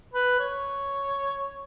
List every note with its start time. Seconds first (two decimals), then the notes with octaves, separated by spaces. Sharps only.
0.14 B4
0.40 C#5